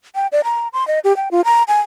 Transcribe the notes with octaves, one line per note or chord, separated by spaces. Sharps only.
G5
D5
A#5
C6
D#5
G4
G5
F4
A#5
G#5